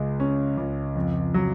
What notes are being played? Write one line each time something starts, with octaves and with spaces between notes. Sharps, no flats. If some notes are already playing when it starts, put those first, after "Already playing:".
Already playing: C#2 G#3
C#4
C#2
F2
F#3